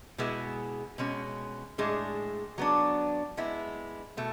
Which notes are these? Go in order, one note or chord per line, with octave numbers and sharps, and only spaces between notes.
B2 G#3 B3 E4 G#4
B2 G#3 C#4
A2 G#3 D4 G#4
F#3 B3 D4
G#3 B3 E4
B2 A3